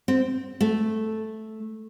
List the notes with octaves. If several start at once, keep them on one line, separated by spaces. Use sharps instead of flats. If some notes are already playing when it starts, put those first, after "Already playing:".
C4
A3